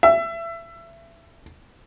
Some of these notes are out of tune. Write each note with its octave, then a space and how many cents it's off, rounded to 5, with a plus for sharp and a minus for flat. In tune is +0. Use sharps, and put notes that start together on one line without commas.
E5 +25